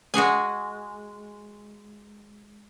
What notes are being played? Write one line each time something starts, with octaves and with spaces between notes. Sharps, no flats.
G#3 F#4 G#4 G#5